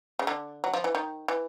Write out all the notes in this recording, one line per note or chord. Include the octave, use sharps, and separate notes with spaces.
C#3
D3
F#3
F3
E3
D#3
E3